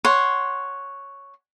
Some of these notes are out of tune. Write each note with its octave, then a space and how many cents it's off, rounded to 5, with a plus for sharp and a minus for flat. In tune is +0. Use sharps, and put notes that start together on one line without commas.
C#5 +0 F#5 +0 C6 +0